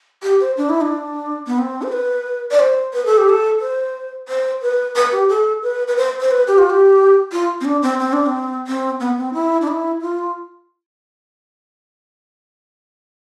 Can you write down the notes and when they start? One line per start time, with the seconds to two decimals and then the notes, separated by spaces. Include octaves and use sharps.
0.23 G4
0.40 C5
0.57 D4
0.69 E4
0.81 D4
1.47 B3
1.58 C4
1.82 C5
1.92 B4
2.51 D5
2.60 C5
2.94 B4
3.06 A4
3.18 G4
3.29 A4
3.61 C5
4.28 C5
4.62 B4
4.96 B4
5.12 G4
5.29 A4
5.63 B4
5.88 B4
5.97 C5
6.21 C5
6.31 B4
6.48 G4
6.58 F4
6.70 G4
7.32 F4
7.61 C4
7.65 D4
7.82 C4
7.99 C4
8.13 D4
8.26 C4
8.67 C4
9.00 B3
9.18 C4
9.34 E4
9.62 D4
9.68 E4
10.02 F4